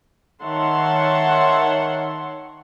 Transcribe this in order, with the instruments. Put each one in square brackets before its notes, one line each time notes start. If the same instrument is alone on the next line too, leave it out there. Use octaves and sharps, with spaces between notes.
[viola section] D#3 C#5 E5 F#5 A5 C6